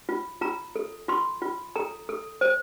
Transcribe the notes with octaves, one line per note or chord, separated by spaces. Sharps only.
F4
F4 A#5
A4
F4 C6
F4
A4 A#5
A4
C5